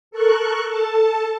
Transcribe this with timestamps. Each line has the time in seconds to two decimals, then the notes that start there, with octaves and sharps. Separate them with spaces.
0.11 A4 A#4 C#6 F#6
0.68 A4 A5